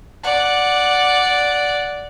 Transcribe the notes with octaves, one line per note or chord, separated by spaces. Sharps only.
D5 F#5